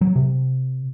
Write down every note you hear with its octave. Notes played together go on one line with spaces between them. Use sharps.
F#3
C3